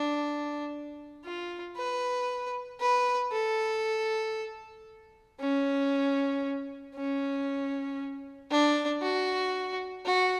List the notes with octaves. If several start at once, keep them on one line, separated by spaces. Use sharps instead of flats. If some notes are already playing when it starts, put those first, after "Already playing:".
Already playing: D4
F4
B4
B4
A4
C#4
C#4
D4
F#4
F#4